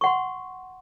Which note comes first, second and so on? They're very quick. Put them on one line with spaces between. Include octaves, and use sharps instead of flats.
C#6 F#5 C6